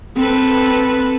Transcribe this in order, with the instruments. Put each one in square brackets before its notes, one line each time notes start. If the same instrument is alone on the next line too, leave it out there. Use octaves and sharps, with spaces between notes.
[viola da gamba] C4 A4 B4